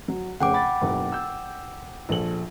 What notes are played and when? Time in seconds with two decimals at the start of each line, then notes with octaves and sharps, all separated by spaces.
0.08 F#3
0.40 F1 C#3 F#5 G5 D6
0.54 B5 A6
0.81 F#1 B1
1.12 E6 G6
2.09 A#1 A4 F#7